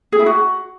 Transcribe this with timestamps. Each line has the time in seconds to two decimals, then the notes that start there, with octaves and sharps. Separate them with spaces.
0.12 G#4
0.19 E4
0.26 F#4